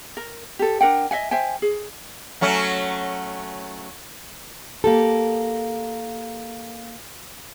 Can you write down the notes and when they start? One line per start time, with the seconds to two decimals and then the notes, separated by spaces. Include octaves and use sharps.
0.17 A#4
0.59 G4 A4
0.81 D4 A#4 F#5 G5
1.11 D#5 E5 F#5 G#5
1.31 C5 E5 G5 G#5
1.62 G#4
2.41 F#3 A3 C#4
4.84 A#3 G4 A4